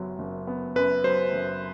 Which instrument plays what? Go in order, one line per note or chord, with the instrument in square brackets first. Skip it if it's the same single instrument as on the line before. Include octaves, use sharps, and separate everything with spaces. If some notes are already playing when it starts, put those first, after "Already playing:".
Already playing: [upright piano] F#1 F#2 F#3 B3
F#1
B3
[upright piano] F#2 [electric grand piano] B4
[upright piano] F#3 [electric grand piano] C5
[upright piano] F#1